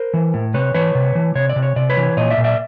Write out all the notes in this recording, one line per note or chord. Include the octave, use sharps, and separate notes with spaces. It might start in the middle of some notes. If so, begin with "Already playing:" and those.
Already playing: A#4 C5
E3
A2
C3 B4 C#5
E3 B4 C#5
C3
E3
C3 C#5
D5
C3
C#5
C3 D5
B4 C#5
E3
A#2 C#5 D#5
D5 E5
A#2
D5 E5